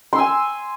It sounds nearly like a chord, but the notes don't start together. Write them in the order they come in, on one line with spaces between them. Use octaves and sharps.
C6 E6 G#5